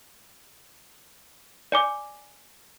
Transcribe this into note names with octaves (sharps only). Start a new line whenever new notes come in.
D5 G#5 D6